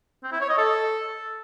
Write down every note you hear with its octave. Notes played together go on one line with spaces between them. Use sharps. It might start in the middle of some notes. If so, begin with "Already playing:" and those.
C4
E4
C#5
D#5
A4